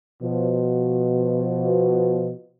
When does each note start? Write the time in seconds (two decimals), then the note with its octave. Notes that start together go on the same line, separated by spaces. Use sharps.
0.22 B2 F3